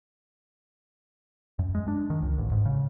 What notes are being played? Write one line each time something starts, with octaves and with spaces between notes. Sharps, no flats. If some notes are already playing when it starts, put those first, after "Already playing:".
F#2
G#3
D4
D#3
C#2
A1
G#2
C#3